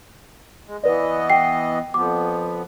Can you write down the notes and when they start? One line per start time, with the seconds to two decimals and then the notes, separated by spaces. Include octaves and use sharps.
0.66 G#3
0.84 E3 B3 B4 D5 D#5
1.30 G5 C7
1.94 F2 F3 B3 D6